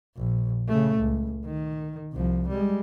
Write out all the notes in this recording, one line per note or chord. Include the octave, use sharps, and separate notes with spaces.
A#1
C#3 A3
C#2
D#3
C2 F3
G3 G#3